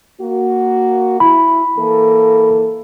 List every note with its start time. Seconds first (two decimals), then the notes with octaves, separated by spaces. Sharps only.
0.20 A#3 F#4
1.20 E4 B5
1.78 E3 A#3 A4